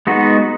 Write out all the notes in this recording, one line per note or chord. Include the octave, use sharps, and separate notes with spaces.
G#3 B3 D#4 F#4